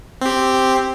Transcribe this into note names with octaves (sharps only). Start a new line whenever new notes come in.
C4 G4